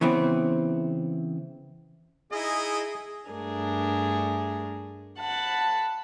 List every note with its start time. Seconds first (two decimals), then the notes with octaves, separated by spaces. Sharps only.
0.01 C#3 E3 B3 C4
2.32 D#4 E4 G#4 D#5
3.29 G2 A3 D4 G#4 A#4
5.18 F#5 A5 B5